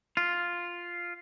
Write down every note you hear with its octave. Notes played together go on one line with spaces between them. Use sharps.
F4